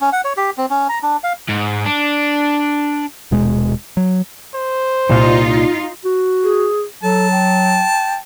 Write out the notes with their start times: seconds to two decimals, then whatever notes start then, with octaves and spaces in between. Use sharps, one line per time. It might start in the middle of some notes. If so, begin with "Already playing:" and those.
0.01 C#4
0.12 F#5
0.24 C#5
0.37 G4
0.57 C4
0.70 C#4
0.89 A#5
1.03 D4
1.24 F5
1.49 G#2
1.86 D4
3.31 D#1 B2 G#3
3.97 F#3
4.55 C5
5.10 C2 A#2 D#4 F4
6.05 F#4
6.44 G#4
7.03 F#3 A4 A5
7.31 G5